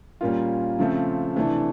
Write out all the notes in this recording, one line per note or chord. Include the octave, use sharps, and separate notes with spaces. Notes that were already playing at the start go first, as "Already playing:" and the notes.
A#2 G3 A#3 C#4 F4
C#3 F3 A3 C4
C3 E3 A3 D4